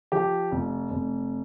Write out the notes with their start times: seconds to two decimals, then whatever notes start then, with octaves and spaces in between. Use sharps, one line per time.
0.12 F3 G4
0.52 F1
0.90 F1